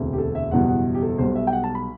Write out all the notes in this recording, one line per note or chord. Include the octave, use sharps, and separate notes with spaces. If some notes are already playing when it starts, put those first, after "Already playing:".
Already playing: E1 D2 C3
G4
A4
E5
F#1 E2 B2 G3 F#5
F#5
G4
A4
B1 B2 G3 C5
E5
G5
F#5
A5
B5